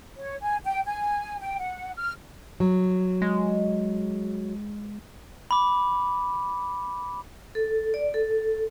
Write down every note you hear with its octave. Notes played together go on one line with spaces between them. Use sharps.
C#5
G#5
G5
G#5
G5
F#5
F6
F#3
G#3
B5 D6
A4
D5
A4